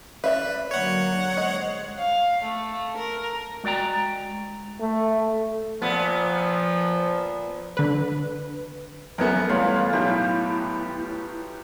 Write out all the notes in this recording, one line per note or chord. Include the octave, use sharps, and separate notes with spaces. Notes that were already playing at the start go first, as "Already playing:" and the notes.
B4 D5 E5 F5
D3 F#3 A#3 C#5 F#5
G#3 C5 D#5
F5
A3
A#4
G#3 F#4 D5 G5 A#5
A3
A#2 F3 B3
D3 B4
F#2 A3 B3 A#4 G#5
E2 G3 A3 B3 F4 B4 C#5 F5
B1 A2 E4 G4